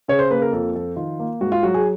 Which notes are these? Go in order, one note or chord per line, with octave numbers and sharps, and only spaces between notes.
C#3 C#5
C5
A#3 B4
A#4
F2 A4
F3 A4
D#3 F4
A#3
G#2 F#4
F4
F#3 F#4
G#4